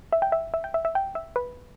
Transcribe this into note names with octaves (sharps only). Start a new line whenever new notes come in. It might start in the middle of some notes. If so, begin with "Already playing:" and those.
E5
G5
E5
E5
G5
E5
E5
G5
E5
B4